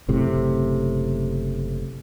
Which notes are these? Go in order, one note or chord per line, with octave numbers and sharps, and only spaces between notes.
F#1 A2 C3